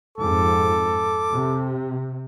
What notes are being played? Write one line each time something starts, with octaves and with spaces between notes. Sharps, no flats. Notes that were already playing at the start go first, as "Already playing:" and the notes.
F2 G#2 A4 D6
C3